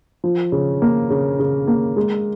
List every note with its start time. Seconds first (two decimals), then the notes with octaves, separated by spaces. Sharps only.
0.24 F3
0.52 C#3
0.82 A#3
1.10 C#3
1.39 C#3
1.67 A#3
1.97 G#3